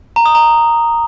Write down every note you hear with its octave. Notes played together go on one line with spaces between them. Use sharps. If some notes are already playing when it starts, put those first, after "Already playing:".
A#5
D#6
A#5